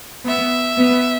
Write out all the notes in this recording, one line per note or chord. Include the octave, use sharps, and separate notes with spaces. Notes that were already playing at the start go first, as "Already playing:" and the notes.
B3 E5
B3